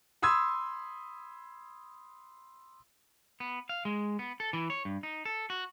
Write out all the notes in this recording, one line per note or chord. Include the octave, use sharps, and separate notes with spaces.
B5 C6 D#6 E6 G#6
B3
F5
G#3
B3
A4
E3
C#5
G2
D#4
A4
F#4